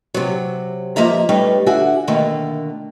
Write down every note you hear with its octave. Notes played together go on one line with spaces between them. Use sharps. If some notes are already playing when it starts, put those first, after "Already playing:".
C3 F#3
F3 A#3 D#5 E5 A#5
G3 A3 D#4 B4 C#5
D3 F#4 E5 G#5
B2 D3 D#3 A3 A#3